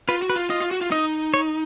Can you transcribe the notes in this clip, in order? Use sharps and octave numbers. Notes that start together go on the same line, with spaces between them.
F4 B4
F#4
B4
F4
F4 D#5
F4
F#4
F4
D#4 D#5
C#5